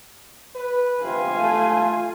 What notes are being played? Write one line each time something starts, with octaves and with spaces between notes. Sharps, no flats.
B4
C3 F4 F5 G#5
A3